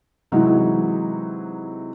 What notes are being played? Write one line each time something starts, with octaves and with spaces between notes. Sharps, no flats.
C3 E3 F#3 G#3 D#4 E4